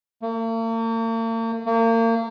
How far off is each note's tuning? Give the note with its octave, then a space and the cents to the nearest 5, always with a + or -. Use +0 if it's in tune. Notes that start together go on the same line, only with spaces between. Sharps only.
A#3 -45
A#3 -35